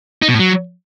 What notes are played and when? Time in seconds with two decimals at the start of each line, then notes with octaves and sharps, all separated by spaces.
0.22 D#4
0.28 B2
0.34 A2
0.39 F#3